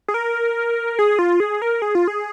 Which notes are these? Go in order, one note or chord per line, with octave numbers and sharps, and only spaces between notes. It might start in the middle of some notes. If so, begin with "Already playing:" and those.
G#4
A#4
G#4
F4
G#4
A#4
G#4
F4
G#4